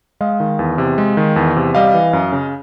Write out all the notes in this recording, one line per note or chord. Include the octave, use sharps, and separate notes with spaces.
G#3 D#5 F5
D#3
E2
C3
G#3
D#3
E2
C3
G3 D#5 F5
E3
F#2
C#3